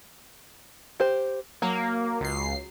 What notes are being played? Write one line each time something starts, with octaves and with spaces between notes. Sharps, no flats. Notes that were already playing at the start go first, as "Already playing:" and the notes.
G4 C5
F#3 A#3
C#2 C7